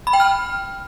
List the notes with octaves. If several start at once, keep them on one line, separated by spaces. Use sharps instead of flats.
B5
G5
F6